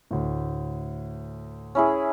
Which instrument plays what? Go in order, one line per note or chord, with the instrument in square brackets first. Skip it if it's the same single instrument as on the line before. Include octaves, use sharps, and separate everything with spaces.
[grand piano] D2 A2
[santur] C#4 E4 G#4